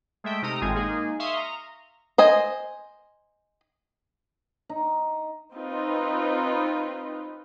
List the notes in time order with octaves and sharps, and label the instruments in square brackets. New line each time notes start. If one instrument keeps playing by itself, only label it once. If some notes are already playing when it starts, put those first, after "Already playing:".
[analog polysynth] G#3 A3 E5 G5
C3 D#4 A#5 D#6 F6
G#1 A2 G#3 C4 F4 G#5
G#3 A#3 D#4 G#4
E5 F5 C6 C#6 D#6
A#5
[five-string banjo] C5 D#5 G#5
[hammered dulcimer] D#4
[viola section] C4 D#4 F4 B4